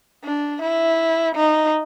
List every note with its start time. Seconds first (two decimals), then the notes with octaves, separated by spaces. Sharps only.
0.24 D4
0.62 E4
1.36 D#4